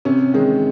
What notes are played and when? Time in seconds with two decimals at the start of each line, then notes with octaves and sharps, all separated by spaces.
0.05 C3 C#4
0.34 D#3 G#3